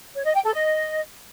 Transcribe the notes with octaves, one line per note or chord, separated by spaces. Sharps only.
C#5
D#5
G5
A4
D#5